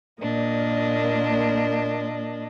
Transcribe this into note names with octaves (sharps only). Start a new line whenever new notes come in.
A#2 A#3 D4 D#5